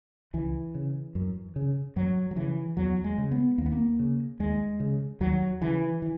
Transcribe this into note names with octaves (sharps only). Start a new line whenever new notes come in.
C#2 E3
C#3
F#2
C#3
F#2 F#3
F#3
C#3 E3
E2 F#3
G#3
C#3
B3
D#2 A#3
B3
A#3
C#3
D#2 G#3
C#3
D#2 F#3
C#3 E3
E3